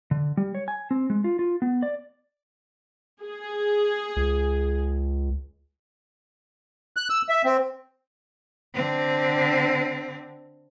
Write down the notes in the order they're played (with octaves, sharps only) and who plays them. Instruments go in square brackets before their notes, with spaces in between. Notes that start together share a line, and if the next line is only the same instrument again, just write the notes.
[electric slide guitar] D3
G3
C#5
G#5
C4
G#3
F4
F4
B3
D5
[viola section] G#4
[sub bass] C#2
[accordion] F#6
E6
E5
C4
[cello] D3 C4